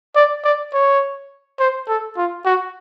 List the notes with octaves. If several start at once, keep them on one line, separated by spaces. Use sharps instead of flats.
D5
D5
C#5
C5
A4
F4
F#4